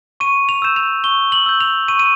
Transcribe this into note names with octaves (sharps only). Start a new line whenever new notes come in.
C#6 D#7
F7
E6 G6 E7
F7
C#6 G7
F#7
E6 G6
F7
C#6 D#7
D#7